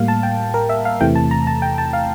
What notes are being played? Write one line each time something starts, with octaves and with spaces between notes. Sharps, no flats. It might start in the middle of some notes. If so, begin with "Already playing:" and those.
Already playing: A2 G3 A#3 F5
A5
G5
A#4
E5
F5
E2 C3 E3 A3 G5
A5
A#5
A5
G5
A5
F5